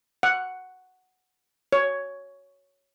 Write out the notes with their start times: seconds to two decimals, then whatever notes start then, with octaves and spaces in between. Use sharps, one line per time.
0.23 F#5
1.73 C#5